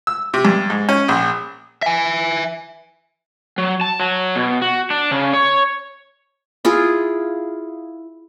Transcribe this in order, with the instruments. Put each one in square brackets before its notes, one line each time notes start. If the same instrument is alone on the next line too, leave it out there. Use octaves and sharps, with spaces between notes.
[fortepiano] E6
C3
G2
G#2
C#4
A#1
[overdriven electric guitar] E5 G#5
[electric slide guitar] F#3
A5
F#3
B2
F#4
D4
C#3
C#5
[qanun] E4 F4 G#4